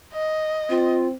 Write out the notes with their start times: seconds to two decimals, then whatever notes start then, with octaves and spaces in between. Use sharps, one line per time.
0.13 D#5
0.70 C4 F4